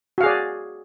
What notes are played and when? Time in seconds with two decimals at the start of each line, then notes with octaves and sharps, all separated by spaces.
0.18 F#4
0.21 F5
0.23 G#4
0.26 D5